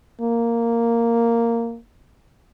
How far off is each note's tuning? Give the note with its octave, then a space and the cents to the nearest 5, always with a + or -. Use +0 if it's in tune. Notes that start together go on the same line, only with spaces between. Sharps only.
A#3 -5